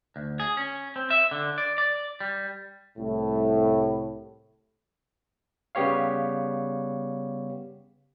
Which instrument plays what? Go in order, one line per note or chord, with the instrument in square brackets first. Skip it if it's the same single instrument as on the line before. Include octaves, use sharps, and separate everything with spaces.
[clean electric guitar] D2
G#4
C#4
C4
E5
D3
D5
D5
G3
[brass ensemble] C2 A2
[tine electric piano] C#3 G3 B3 G4 C#5 F5